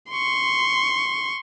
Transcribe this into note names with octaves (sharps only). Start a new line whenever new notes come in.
C6 C#6